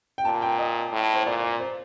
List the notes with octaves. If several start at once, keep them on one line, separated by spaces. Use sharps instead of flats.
G5
A#2 A5
G5
D#5
A2
C5
A#2 D5
D5
C5